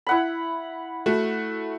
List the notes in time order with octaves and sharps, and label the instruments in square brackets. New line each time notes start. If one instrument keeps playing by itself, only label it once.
[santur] E4 F#5 B5
[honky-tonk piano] A3 F#4